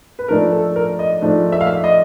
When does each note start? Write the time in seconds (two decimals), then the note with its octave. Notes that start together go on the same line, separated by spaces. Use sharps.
0.19 B4
0.28 G#2 F3 A3 D4 A#4
0.52 A4
0.76 A#4
0.99 D#5
1.21 G#2 F3 A3 D4
1.52 E5
1.61 F5
1.67 E5
1.84 D#5